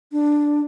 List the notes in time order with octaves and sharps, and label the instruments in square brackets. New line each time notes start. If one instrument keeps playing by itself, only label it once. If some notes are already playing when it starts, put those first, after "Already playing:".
[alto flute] D4